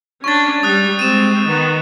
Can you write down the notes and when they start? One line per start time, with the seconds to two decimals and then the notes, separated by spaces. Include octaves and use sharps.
0.24 C#4 D4 C#6 A6
0.63 G3 D#6 F#6
0.99 G#3 C4 D#7 E7
1.47 D#3 B3